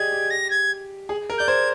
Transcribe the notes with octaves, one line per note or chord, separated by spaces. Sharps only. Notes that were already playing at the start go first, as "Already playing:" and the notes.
Already playing: G4 G#4 D5 D#5 G#6
G4
A#6
G#6
G#4
A#4
D5 G6
C5 G#6